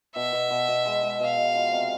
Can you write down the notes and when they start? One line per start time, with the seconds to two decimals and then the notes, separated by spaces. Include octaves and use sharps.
0.16 B2 E5
0.33 B2
0.51 B2
0.68 B2
0.86 G#3
1.03 G#3
1.20 B2 F5
1.38 B2
1.55 F3
1.73 C3